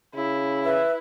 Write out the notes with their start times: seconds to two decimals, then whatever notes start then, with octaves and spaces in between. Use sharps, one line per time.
0.15 C#3 E4
0.65 B4 E5